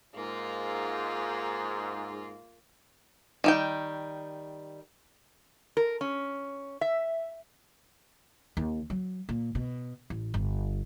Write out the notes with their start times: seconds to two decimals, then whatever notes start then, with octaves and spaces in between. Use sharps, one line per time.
0.14 G#2 A#3 F4
3.44 D#3 G3 G5
5.77 A#4
6.01 C#4
6.81 E5
8.57 D#2
8.90 F#3
9.29 A#2
9.55 B2
10.10 A1
10.34 G1